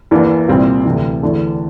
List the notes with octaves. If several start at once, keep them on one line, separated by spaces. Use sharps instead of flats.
E2 E3 A#3 D4
C2 A#2 G3 C4
D2 C3 E3
E2 D3 A3